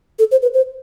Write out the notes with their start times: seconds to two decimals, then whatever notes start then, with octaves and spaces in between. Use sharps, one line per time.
0.19 A4
0.31 C5
0.42 B4
0.54 C5